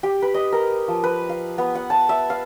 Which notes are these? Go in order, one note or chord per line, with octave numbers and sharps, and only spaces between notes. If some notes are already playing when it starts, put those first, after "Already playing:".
G4
B4
D#5
A#4
F3
B4
F5
B3
F#5
A5
E5
F5